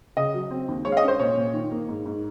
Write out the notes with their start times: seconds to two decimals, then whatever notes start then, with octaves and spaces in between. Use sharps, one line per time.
0.17 C#3 D#5
0.34 F#3
0.51 C4
0.68 D#2
0.85 G#3 C#5
0.92 F5
0.97 D#5
1.03 C#4
1.08 C5
1.20 A#2 C#5
1.37 A#2
1.53 D#3
1.71 A#3
1.89 G#2
2.05 G#2